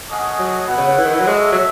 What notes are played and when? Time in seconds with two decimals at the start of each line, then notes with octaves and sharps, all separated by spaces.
0.09 A3 C#4 G#4 D#5 F#5
0.39 F#3
0.68 B2 E4 B4 F#5
0.78 C#3
0.88 C#3
0.98 E3
1.05 D#3
1.13 E3
1.20 F#3
1.27 G#3 F#4 A4 C#5 E5
1.52 F#3